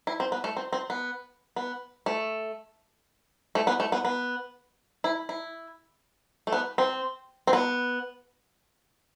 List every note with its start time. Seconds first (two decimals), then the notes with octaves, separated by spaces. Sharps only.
0.07 E4
0.20 C4
0.32 B3
0.44 A3
0.57 C4
0.73 C4
0.90 B3
1.56 B3
2.06 A3
3.55 A3
3.67 B3
3.80 A3
3.92 B3
4.05 B3
5.04 E4
5.29 E4
6.47 A3
6.52 B3
6.78 C4
7.47 C4
7.53 B3